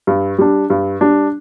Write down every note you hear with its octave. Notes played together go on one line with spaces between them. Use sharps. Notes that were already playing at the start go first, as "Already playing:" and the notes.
G2
G3 D4
G2
G3 D4